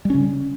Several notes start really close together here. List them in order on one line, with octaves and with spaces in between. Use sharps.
G3 C#4 C#3